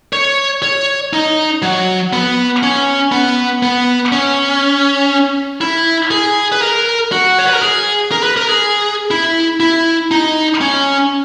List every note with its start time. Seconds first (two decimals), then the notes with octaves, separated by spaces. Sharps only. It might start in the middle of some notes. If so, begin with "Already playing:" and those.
0.13 C#5
0.63 C#5
1.13 D#4
1.62 F#3
2.13 B3
2.63 C#4
3.12 B3
3.63 B3
4.12 C#4
5.61 E4
6.11 G#4
6.52 B4
6.62 A#4
7.12 F#4
7.39 C#5
7.47 B4
7.54 A#4
7.61 G#4
8.12 A#4
8.23 B4
8.37 A#4
8.49 G#4
9.11 E4
9.60 E4
10.11 D#4
10.61 C#4